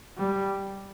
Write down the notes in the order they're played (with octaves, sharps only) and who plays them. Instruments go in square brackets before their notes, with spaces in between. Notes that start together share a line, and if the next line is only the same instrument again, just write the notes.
[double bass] G3